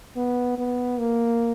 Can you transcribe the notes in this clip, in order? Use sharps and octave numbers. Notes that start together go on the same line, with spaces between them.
B3
B3
A#3